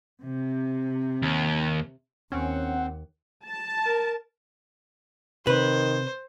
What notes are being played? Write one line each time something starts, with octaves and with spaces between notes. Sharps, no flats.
C3
D#2
D#2 C4 C#4 F#5
A5
A#4
C3 D#3 B4 C5